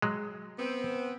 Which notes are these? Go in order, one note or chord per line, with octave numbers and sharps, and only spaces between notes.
F#3 G#3
B3 C4